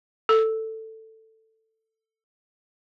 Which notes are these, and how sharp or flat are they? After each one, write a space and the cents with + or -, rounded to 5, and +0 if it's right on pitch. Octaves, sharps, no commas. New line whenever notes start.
A4 +10